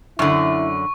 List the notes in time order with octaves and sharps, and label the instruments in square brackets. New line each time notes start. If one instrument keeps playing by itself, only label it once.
[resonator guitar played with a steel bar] F#2 D3 [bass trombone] E4 [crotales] C#6